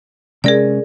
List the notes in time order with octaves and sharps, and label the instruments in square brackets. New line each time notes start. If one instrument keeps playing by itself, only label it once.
[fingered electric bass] C3 G#3 C#4 [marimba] G#4 A#4 D5